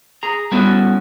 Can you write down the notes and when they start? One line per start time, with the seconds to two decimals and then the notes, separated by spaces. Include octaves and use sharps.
0.23 G#4 A#5
0.52 G3 B3 C#4 E4 F#4 A4